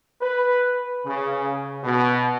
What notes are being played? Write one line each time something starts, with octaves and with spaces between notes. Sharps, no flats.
B4
C#3
B2